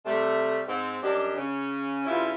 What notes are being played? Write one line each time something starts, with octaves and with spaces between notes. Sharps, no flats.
C3 G3 A3
G#2 C4
F#2 G3 D4 G4 D#5
C#3 C#4
G2 C#3 E4 F4